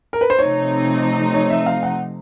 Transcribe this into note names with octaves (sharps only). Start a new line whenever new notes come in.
A#4
B4
C5
C3 F3 A3 C4 D#4 C#5
C#5
E5
F5
F#5